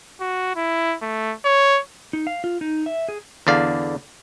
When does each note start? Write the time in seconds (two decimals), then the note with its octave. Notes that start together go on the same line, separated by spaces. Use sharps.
0.21 F#4
0.56 E4
1.02 A3
1.45 C#5
2.13 D#4
2.27 F5
2.44 F4
2.61 D#4
2.86 E5
3.09 G#4
3.47 E2 D3 D5 F5